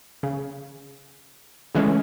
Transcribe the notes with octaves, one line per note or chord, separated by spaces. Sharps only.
C#3
C#3 E3 G#3 A3 C#4